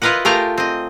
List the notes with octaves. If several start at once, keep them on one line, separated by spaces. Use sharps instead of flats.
E4 F4 A#4 B4 D#5 F#5
A3 F4 G4 G#4 A#4 A#5
C4 D#5